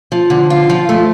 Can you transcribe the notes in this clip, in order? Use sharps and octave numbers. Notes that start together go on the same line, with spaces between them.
F3
D3
F4
F3
A3